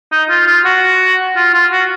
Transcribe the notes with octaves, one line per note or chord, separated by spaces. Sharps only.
D#4
F4
F4
F#4
F4
F4
F#4